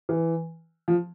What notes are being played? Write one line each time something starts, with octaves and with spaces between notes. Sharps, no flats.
E3
F3